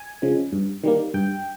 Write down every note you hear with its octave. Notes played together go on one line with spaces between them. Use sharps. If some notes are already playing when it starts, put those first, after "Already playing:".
Already playing: G#5
C#3 F3 G#3
G2
D#3 G3 A#3
G2 G5